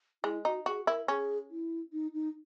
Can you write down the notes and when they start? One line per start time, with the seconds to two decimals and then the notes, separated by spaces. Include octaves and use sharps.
0.24 G#3 E4
0.45 D#4 F#4
0.66 F#4 G#4
0.87 E4 A#4
1.08 C#4 G#4
1.50 E4
1.93 D#4
2.14 D#4